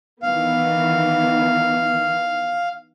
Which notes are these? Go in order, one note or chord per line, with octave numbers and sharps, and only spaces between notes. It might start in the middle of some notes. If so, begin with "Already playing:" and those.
D#3 E3 B3 F5